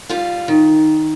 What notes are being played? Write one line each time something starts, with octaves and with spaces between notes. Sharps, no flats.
G3 F4 F5
D#3